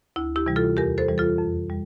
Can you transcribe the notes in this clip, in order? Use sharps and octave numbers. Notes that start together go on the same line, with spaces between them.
D2 E4
E4 G4
C3 E3 G3
F4 A4
E2 G4 A#4
A4 C5
E3 G3
F4 A4
F2
G3